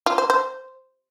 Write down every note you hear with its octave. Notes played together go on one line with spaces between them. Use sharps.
F4
C5
C5